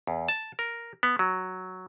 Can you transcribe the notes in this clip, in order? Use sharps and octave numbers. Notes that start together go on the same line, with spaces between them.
E2
A5
A#4
B3
F#3